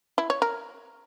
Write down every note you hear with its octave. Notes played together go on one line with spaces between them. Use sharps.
E4
C#5
A#4